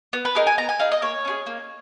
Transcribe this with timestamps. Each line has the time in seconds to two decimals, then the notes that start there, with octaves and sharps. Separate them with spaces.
0.13 B3
0.25 B4
0.35 D#4 G#4 A#4
0.47 G#5
0.58 B3 A#5
0.69 G#5
0.80 D#4 G#4 F5
0.92 D#5
1.02 A#3 C#5
1.25 C#4 F4 G#4
1.46 A#3